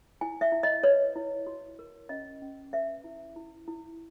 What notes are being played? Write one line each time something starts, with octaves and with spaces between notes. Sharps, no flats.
E4 G#5
E5
E4
D#5
B4 C#5
E4
F#4
A#4
C#4 D#5
C#4
B4 E5
E4
E4
E4